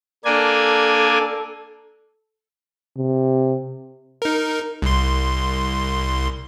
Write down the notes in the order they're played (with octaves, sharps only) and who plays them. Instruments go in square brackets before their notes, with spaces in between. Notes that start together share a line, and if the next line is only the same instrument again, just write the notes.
[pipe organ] A#3 D4 G#5 [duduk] A4
[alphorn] C3
[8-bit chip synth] D#4 A#4
C2 C6